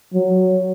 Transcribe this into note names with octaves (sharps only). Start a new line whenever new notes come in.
F#3